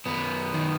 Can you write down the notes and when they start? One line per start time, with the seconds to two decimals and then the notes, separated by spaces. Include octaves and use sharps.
0.06 F#2 B3
0.53 D#3